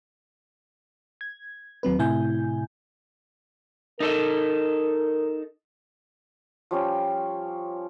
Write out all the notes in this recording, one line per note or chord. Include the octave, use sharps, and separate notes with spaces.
G#6
D#2 F#3 C4 B4
A2 C3 E4 G#5 G6
D#4 A4 A#4 D#5
F3 G3 C#4 G5